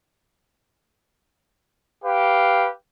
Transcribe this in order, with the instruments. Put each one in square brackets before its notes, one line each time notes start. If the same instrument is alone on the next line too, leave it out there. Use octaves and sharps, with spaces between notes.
[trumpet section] G4 B4 F5